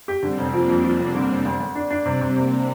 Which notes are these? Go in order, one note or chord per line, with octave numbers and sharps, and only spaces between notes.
G4
D3 G3 C4
F1
F3 A#3 D4
F2
F3
F1
D3
F1
D2
D2
D4
D4
C3 G3 C4
C3
C3 A#3 D4